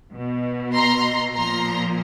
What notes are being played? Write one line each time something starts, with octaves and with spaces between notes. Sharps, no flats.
B2
A#5 C6
A#2 F3 A#5 C6